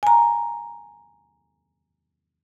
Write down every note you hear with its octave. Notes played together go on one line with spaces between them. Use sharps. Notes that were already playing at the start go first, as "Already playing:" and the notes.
G#5 A#5